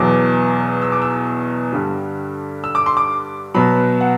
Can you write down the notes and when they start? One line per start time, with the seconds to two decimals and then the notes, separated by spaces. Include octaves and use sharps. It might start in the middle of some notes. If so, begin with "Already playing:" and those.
Already playing: E2 B2 F#3 D6
0.82 E6
0.92 D6
1.02 E6
1.73 G2 D3 G3
2.64 E6
2.75 D6
2.86 C6
2.97 D6
3.54 B2 F#3 B5
4.01 F#5